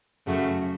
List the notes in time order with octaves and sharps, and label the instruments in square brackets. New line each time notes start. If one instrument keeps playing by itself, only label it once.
[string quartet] F#2 C#3 A3 F#4